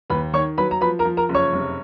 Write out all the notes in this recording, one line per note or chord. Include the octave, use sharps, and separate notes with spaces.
D#2 B4 B5
D#3 C#5 C#6
F#3 B4 B5
A#5
F3 B4 B5
A#4 A#5
F3
A#4 A#5
F#1
C#5 C#6
F1